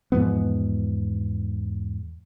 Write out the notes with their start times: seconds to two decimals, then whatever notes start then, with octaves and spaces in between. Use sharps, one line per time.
0.12 E2 G#2 F3 B3